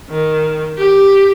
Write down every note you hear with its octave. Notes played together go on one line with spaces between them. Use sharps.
D#3
G4